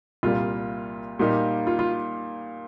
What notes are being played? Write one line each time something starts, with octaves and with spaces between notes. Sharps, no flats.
C2 A#2 G3 F4
A#2 G3 A#3 D#4 G4
F4
F4